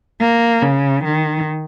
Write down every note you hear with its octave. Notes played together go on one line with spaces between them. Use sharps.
A#3
C#3
D#3